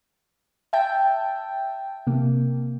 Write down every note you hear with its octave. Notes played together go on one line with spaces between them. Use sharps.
E5 G5 A5
C3 A#3